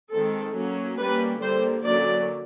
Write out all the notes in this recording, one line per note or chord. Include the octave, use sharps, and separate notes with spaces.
D#3 G#3 C4 A4
F#3 A#3 C#4
G3 A#3 C#4 B4
D3 G3 A#3 C5
D3 F#3 A#3 C#4 D5